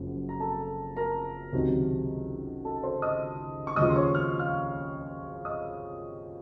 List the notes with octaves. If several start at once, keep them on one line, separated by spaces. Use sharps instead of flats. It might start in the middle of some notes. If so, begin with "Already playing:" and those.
Already playing: F#1 F#2 F3
A#5
A4 A5
A#4 A#5
C#2 C3 D#3 F#3
A4 A5
C5 C6
D#5 D#6
C#6
D#2 C#3 F3 D#5 D#6
C6
C#5 C#6
F6
F5 F6
D#5 D#6